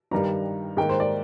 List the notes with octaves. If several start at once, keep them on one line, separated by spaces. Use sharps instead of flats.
G2 D#3 G3 A#5
G#2 D#3 A#3 G5
C5
D5